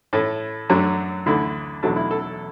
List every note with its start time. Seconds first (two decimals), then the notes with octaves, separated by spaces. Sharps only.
0.13 A2 A3
0.69 F#2 F#3 A3 D4
1.26 D2 D3 A3 E4
1.83 E2 B2 F#3 A3 D4
1.96 E4
2.11 A4